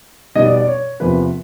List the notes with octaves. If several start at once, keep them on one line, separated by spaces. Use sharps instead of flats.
B2 G3 B3 D#4 D#5
D5
D5
C#5
E2 C3 F3 A#3 B4